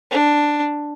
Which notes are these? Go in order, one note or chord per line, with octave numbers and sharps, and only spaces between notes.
D4